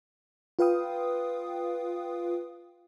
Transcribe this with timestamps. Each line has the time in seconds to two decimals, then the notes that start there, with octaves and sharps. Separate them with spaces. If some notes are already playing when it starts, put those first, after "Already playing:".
0.59 F4 B4 F5 G5 D#6